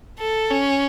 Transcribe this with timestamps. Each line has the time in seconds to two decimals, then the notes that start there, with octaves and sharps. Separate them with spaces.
0.19 A4
0.51 C#4